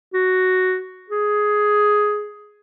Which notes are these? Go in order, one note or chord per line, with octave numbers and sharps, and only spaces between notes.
F#4
G#4